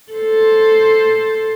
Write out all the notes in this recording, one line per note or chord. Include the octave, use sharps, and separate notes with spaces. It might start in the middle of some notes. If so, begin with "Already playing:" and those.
A4 C5